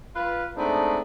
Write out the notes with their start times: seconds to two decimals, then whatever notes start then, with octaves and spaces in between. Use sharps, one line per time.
0.16 F4 B4
0.56 G#3 A3 B3 C4 D4 D#4